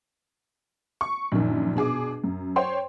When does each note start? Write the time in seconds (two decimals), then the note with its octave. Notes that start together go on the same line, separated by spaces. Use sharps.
1.01 C#6
1.32 A#1 F#2 D#3
1.75 B2 D4 G#4 D6
2.24 F#2
2.56 C5 C#5 G5 C6